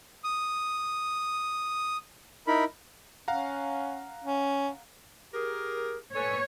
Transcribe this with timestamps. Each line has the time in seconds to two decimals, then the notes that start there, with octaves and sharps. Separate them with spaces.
0.24 D#6
2.47 D#4 E4 A#4 B5
3.28 C#4 F5 F#5 A#5
4.24 C#4
5.34 G4 G#4 A#4
6.16 A4 B4 C#5 G#5